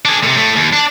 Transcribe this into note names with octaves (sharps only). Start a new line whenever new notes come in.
D4 G#4
A2 C3
A2 A3
D#2
D4